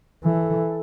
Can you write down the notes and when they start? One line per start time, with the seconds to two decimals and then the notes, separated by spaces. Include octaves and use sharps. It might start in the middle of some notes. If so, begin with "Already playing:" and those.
0.24 E3 A4